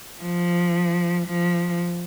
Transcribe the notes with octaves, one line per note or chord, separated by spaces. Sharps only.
F3
F3